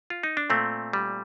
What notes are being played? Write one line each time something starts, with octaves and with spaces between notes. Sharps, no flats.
F4
D#4
D4
A#2 A3 C4
G3